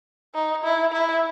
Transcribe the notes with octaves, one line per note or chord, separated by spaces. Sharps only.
D#4
E4
E4